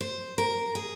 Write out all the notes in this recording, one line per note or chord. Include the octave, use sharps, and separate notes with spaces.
C5
A#4
G#4